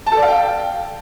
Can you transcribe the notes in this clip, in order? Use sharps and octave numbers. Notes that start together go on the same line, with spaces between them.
A5
A4
D5
F5
G5